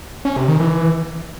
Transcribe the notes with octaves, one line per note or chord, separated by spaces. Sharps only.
C#4
C3
D#3
E3